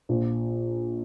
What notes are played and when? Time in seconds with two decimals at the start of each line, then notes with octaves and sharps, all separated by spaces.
0.09 A#1 F4